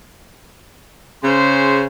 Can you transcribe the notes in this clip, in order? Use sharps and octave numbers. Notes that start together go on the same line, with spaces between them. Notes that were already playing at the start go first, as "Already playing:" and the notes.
C#3 C#4 G#4 C5 C6